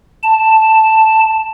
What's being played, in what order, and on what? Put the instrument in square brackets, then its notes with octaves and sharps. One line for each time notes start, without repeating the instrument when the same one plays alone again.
[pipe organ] A5